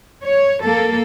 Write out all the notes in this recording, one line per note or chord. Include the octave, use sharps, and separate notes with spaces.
C#5
A#3 A4